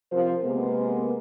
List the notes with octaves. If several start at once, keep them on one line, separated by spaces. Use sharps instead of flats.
C3 F3 C4 A#4 C5
C3 G#3 A#3 B3